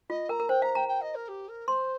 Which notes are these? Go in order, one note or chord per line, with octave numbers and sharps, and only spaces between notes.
F4 D#5
A#4 A#5
A#4
C5 G5
F5 A#5
G5 A#5
G5
D#5
A#4
G4
A#4
C5 C6